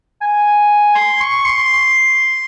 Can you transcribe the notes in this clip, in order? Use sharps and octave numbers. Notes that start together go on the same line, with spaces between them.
G#5
C6
C#6
C6